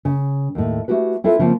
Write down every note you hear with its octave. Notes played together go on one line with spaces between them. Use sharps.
C#3
D#2 A2
A3 E4 F#4 G4 B4
C4 E4 F4 A4 B4
C#3 F3 A#3 C4